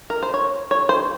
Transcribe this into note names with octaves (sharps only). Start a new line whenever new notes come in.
A#4
C5
C#5
C#5
C5